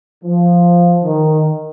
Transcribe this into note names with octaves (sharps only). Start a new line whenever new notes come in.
F3
D#3